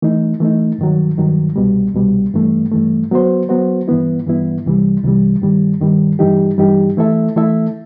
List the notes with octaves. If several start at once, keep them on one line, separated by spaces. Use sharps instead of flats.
E3 A3 D#4
E3 A3 D#4
G2 D#3 F#3
G2 D#3 F#3
C2 B2 G3
C2 B2 G3
G2 E3 A3
G2 E3 A3
F#3 B3 F#4 C5
F#3 B3 F#4 C5
G2 E3 B3 E4
G2 E3 B3 E4
C2 C3 E3 G3
C2 C3 E3 G3
G2 D#3 G3
G2 D#3 G3
G2 E3 G3 D#4 G4
G2 E3 G3 D#4 G4
E3 A3 E4 A4 E5
E3 A3 E4 A4 E5